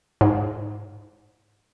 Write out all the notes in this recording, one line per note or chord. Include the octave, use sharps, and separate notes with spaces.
G#2